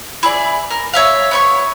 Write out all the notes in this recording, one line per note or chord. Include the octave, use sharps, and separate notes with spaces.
E4 G#4 D5
A#4
C#5 E5 F5
B3 C#5 C#6